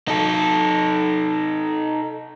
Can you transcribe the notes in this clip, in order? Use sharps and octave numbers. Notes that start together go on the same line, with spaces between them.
D#4 A4